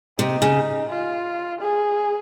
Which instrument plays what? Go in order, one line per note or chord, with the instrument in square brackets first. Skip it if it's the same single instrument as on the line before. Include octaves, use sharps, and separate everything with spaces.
[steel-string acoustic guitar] C3 [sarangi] D#4
[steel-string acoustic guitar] C#3
[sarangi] F4
G#4